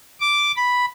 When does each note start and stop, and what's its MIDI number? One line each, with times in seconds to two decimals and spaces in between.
0.20 0.51 86
0.57 0.86 83